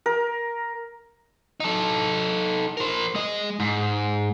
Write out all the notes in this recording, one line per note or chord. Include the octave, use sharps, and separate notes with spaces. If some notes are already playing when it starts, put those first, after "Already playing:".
A#4
D#4 A4
A#4 C5
G#3 D#5
G#2